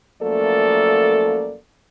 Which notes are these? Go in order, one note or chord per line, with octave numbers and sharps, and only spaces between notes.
F#2 F3 A3 A#3 A4 D5